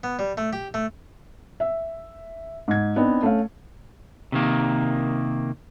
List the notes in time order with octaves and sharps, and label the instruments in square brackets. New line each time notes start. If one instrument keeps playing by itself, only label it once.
[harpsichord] B3
G3
A3
G4
A3
[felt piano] E5
G#2 G#6
B3 C4 D4 D#4
A3 C#4 F5
[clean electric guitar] C3 D#3 A#3